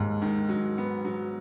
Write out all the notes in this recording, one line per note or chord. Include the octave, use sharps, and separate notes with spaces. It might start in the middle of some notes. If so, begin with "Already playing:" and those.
Already playing: D#2 G#2
D#3
F#3
B3
F#3